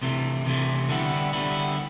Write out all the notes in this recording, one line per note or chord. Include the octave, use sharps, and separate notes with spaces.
C3 E3 A3
C3 E3 A3
D3 G3 B3 E4
D3 G3 B3 E4